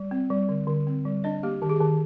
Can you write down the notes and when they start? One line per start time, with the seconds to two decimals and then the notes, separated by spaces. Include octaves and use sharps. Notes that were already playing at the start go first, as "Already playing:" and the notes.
Already playing: G3
0.11 C4
0.30 G3
0.49 D3
0.67 D3
0.87 C4
1.05 G3
1.24 D4 D#5
1.43 A#3 G4
1.62 D#3 G4
1.69 G#4
1.76 D#3 G4